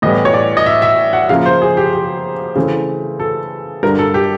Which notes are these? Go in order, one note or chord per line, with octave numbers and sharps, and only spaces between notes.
A2 E3 G3 B3 D#5
C#5
D5
D#5
E5
E5
F#5
C#3 F3 A#3 F5
C5
G#4
G4
G4
C#3 E3 A3 C4
A4
G2 D3 G3 A#4
A4
G4